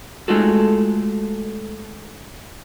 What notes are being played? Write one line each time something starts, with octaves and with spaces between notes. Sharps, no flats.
G#3 A3 D#4 F4 F#4 A4